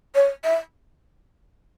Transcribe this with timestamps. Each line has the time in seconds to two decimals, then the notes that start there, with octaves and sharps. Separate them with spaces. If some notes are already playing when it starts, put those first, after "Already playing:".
0.15 C#5
0.44 E5